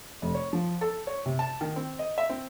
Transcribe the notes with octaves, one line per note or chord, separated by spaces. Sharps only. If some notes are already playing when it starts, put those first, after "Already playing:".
F1
C#5
F3
A4
C#5
C3
A5
D#3
C4
D#5
E5
C4